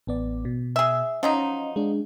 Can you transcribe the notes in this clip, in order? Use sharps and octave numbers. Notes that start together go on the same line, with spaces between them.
A1 B3 D5
B2
G#4 E5
F3 F#3 C#4 D#4 D#5
G#3 D4